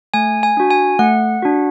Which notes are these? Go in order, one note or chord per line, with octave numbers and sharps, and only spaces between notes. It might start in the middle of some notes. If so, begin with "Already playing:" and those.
A3 G#5
G#5
D4 F#4
G#5
A3 F#5
D4 F#4